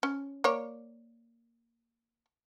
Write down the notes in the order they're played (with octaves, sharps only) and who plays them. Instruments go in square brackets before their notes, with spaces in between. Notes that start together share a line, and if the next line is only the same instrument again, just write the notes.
[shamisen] C#4
A#3 C#5 D5